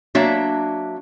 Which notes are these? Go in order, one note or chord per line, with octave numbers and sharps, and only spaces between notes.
F#3 A#3 D4 E5